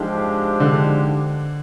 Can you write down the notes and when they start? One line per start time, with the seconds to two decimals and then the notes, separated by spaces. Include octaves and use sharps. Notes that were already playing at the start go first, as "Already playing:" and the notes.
Already playing: G#2 F3 G#3 D4 G4
0.60 D3